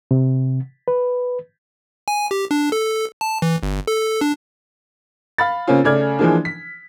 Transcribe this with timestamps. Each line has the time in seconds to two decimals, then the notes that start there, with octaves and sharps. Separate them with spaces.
0.11 C3
0.88 B4
2.08 G#5
2.31 G4
2.51 D4
2.72 A4
3.21 A5
3.42 E3
3.63 G1
3.87 A4
4.21 D4
5.38 F5 B5 A6
5.67 C#3 A#3 C4 C#4 F4
5.84 C#3 A3 D5 F6 G#6
6.19 E3 F3 G#3 A#3 D4
6.45 B6